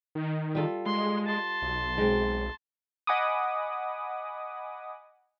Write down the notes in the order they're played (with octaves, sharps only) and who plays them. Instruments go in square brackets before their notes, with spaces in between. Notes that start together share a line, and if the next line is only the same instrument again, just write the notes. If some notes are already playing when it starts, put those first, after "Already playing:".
[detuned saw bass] D#3
[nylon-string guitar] G3 F4 A4
[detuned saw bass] G#3 [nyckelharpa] C6
[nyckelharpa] A5 C6
[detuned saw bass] B1
[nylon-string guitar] G#3 C4
[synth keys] D#5 F#5 G#5 B5 D6 D#6